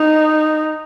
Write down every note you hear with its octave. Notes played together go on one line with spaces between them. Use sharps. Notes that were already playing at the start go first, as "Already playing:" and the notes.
Already playing: D#4